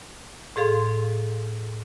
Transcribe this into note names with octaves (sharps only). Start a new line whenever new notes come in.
A2 G#4 A4 F5 C6